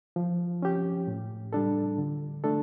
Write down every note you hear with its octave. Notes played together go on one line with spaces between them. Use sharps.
F3
C#4 G4
A2
G3 D4 A4
D3
A3 D4 A4